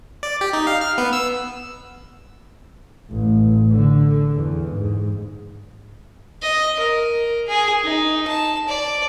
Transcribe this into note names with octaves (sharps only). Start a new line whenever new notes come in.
D5
G4
D#4
F5
F6
B3
E6
A1
D3
E2
G#2
D#5
A#4
G#4
D#4
A5
D5